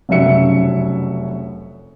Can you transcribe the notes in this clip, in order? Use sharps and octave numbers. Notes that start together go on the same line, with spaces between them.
F1 F#2 C#3 F#3 E5 C#7